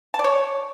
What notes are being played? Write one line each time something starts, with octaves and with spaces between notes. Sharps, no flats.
A5
D5
C#5